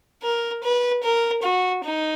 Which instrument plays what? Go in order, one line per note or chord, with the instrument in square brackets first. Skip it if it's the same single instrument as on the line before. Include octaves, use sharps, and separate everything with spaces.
[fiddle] A#4
B4
A#4
F#4
D#4